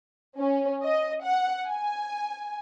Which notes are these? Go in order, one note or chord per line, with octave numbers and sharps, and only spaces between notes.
C#4
D#5
F#5
G#5